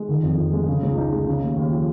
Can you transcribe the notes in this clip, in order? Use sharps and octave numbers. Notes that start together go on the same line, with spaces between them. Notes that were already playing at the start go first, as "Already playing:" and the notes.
Already playing: G#3
D#3
F2
F2
G#3
C#3
C#2
D#4
G#3
C#3
D#2
D#2
F3